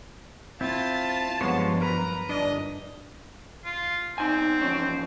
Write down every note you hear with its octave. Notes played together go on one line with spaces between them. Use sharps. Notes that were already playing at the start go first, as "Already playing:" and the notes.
C4 E4 F4 A5 A6
G2 F3 F#3 G#3 B3 C5 C#5
A#4 B4 A#5
G1 D4 D#5
F4
B1 C4 D#4 G#5
E3 F3 C#4